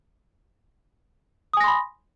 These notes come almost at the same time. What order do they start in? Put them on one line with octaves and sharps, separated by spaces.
D#6 G#5 A#6 C6 B5